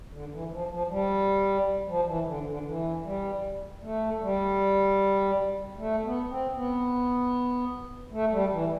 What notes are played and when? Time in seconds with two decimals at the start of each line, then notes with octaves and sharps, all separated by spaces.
0.11 D3
0.30 E3
0.50 F3
0.69 F3
0.89 G3
1.87 F3
2.06 E3
2.25 D3
2.45 D3
2.65 E3
3.04 G3
3.82 A3
4.22 G3
5.78 A3
6.04 B3
6.29 C4
6.56 B3
8.12 A3
8.31 G3
8.51 E3